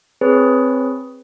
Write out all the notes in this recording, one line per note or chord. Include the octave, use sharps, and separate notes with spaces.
C4 G#4 B4 C#5